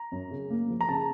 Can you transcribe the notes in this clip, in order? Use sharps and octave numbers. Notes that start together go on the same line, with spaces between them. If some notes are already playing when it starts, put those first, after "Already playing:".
Already playing: A#5
F#2
C#3
A#3
F3
A#5
C#3 A5